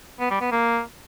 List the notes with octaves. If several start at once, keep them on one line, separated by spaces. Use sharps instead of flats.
B3
G3
B3
A#3